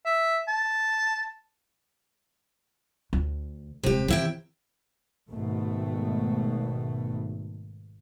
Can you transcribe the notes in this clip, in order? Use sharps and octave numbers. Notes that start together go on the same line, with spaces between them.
E5
A5
D2
D#1 C3 G#3 G4
C3 D#3 E3 E4 G5
G#1 B2 A3